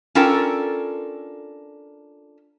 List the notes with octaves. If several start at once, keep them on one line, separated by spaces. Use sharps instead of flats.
C#4 D4 F4 A4 A#4 G5